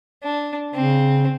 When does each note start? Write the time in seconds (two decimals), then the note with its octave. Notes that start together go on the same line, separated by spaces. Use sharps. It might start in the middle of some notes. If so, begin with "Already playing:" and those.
0.23 D4
0.74 C#3 C4